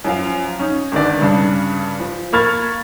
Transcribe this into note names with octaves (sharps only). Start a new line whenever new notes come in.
F#2 F3 F5
C#4 D#4
G#1 D3 D#3 B4 D5
G2 C#3 D4
F3
A#3 B5 C#6 F6 G#6 A6